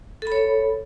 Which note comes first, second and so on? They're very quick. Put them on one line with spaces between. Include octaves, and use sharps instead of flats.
A4 B5 C#5